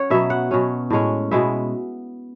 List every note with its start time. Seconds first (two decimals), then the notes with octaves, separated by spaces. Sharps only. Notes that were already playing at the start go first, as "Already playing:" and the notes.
Already playing: C#4 C#5 F#5
0.10 B2 F#3 B3 E5
0.30 F#5
0.51 B2 F#3 C#4
0.90 A2 G#3 C#4
1.31 B2 G#3 B3 E5